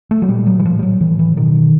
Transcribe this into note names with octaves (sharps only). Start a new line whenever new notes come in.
A3
F#3
A#2 G3
F#3
E3
A2 F3
G3
F#3
A2 E3
E3
B2 D#3